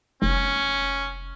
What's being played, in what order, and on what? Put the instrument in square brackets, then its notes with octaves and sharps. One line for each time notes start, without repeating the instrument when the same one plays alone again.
[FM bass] F1 [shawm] C#4